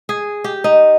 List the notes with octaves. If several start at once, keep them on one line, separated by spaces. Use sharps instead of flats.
G#4
G4
D#4